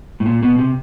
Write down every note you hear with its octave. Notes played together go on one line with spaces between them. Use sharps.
A2
A#2
B2
C3